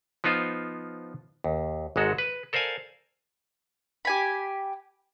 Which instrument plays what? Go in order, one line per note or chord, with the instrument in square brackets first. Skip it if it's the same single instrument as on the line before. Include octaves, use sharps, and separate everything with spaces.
[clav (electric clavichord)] F3 B3 D#4 F4 C5
D#2
G#1 G#2 G#3 F#4 A4
B4
A4 A#4 C5 D5 F5 G#5
[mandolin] G4 G#5 B5